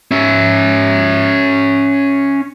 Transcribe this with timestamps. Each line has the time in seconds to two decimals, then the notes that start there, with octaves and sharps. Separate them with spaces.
0.11 C#4 E5